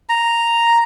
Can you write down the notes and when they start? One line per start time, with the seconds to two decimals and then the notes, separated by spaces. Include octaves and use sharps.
0.09 A#5